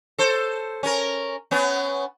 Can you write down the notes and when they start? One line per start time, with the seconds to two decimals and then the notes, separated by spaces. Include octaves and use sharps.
0.18 A4 C5
0.83 C#4 A#4
1.51 B3 C#4